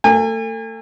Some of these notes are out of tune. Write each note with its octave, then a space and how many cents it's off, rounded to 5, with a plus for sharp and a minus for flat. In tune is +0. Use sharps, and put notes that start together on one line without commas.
A3 +35 G#5 -35